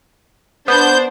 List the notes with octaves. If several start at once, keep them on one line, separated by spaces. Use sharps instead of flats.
B3 D4 C5 G6